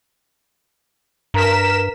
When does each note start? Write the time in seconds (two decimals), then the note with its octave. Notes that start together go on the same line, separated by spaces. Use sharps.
1.34 G2 A#4 B6 E7